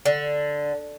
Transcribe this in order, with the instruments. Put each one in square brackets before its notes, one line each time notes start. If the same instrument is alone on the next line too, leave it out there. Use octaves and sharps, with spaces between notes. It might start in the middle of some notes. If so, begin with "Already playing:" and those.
[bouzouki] D3